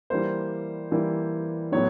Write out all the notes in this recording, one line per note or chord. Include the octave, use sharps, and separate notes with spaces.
E3 G3 A#3 C5
E3 G3 A#3
A2 F#3 B3 C#5